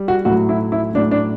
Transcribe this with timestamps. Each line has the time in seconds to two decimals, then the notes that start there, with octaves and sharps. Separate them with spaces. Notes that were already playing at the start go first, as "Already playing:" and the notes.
Already playing: G3
0.08 F#4
0.25 A2 F#3 F#4
0.49 E4
0.72 E4
0.94 A2 F#3 D4
1.11 D4